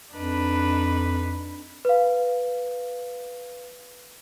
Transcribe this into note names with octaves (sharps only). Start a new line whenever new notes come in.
F2 D4 D#4 B4
B4 F5